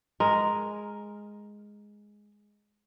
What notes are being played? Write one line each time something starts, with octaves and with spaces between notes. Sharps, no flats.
G#3 A#4